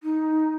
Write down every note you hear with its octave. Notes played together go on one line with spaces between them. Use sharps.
D#4